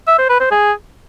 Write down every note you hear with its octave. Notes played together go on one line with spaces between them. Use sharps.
E5
C5
B4
C5
G#4